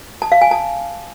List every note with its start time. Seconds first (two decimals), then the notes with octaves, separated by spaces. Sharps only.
0.22 A5
0.32 F5
0.41 G#5
0.51 A5